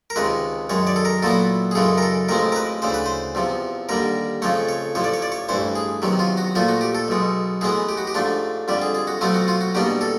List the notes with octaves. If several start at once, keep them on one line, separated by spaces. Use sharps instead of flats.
A#4
C#2 C3 D#3 G#3 B4
F#2 D#3 G#3 C#5
D5
A4
A#4
A#2 F#3 B3 E4 A4
G#4
F#2 C#3 E3 G#3 A4
A#4
A4
A1 A2 F3 G#3 C4 A#4
A#4
B4
D2 C#3 E3 C5
B4
C5
E2 C3 F3
D#2 D3 G3 A#4
F2 C#3 F3 A3 C#5
C#5
A1 A2 F3 C#5
D5
C#5
D5
C#5
A1 G2 E3 C5
G#4
E2 C3 D#3 F#3
F4
F#4
A#2 F3 A3 F4
F#4
G4
A4
B1 B2 G#3
A2 E3 G#3 B3 G#4
G4
F#4
G4
G#2 F3 A3 D4
F2 D3 G3 G4
G#4
G#4
F#4
B2 F#3 A3 C4 F4
F#4
F4
F#4
E2 B2 G3 A#3 D4 G4
A4